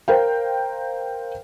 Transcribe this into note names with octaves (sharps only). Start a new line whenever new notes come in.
A#4 C5 F5 G5